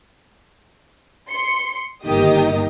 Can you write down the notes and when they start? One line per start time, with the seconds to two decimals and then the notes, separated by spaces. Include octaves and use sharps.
1.29 C6 C#7
2.04 G1 D#3 A#3 D#4 G4 D#6